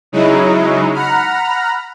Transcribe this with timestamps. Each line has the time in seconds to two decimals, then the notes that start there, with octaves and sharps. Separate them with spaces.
0.12 C#3 F#3 G#3 D#4 E4
0.93 F#5 A#5 B5 F6